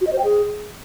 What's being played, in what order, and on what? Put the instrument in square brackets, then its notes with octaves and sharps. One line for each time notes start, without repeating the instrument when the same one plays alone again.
[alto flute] F#4
D#5
C5
G5
G#4